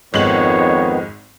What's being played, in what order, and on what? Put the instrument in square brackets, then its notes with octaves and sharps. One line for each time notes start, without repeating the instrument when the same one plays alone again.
[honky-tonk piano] G#1 G#3 F#7 [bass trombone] F2 [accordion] D#3 B3 [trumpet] C#5